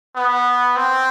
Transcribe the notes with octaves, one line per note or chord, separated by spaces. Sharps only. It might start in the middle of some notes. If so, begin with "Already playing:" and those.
B3
C4